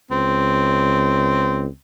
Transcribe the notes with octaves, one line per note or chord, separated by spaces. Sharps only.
C#2 C4